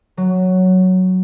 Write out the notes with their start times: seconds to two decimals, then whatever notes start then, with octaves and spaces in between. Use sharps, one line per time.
0.17 F#3